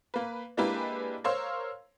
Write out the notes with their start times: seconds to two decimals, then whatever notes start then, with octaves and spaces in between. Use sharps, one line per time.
0.14 A#3 B4
0.57 G#3 A#3 D4 E4 G4 B4
1.24 A#4 C5 C#5 F5 C6 E6